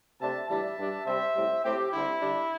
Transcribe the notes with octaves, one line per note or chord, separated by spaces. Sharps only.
C3 A3 D4 E5 A5
A2 E3 G3 D4 E5 A5
G2 G3 D4
C3 G3 C4 C5 E5
A2 G3 C4
A2 A3 C4 G4
D3 G3 C4 E4
D3 G3 D4